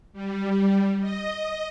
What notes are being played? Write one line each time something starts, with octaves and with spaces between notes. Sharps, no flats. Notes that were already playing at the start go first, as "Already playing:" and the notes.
G3
D#5